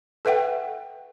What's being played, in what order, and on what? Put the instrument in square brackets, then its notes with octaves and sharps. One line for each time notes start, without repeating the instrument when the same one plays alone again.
[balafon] A4 B4 E5 F#5 G5